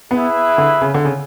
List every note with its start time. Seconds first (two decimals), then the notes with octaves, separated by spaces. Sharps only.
0.11 B3 E4 G#4 B4 E5
0.58 D3
0.82 C#3
0.94 D3
1.05 C#3